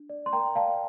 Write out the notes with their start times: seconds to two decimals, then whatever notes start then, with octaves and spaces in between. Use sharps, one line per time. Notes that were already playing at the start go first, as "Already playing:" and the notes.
Already playing: D4
0.10 D5
0.26 C6
0.33 A#4 G5 A#5
0.56 D5 F5 A5